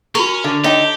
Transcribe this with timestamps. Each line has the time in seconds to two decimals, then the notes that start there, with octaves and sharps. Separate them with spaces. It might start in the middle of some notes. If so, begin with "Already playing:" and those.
0.15 C#4 F#4 A#4 C#6
0.44 D3
0.64 D#4 G4 C#5 E5 G5